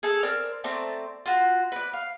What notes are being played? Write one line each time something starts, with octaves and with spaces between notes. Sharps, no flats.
G#4 A4 A5
C4 A#4 D5 F6
A3 C4 D5 A#5
F4 F#4
B4 D5
F5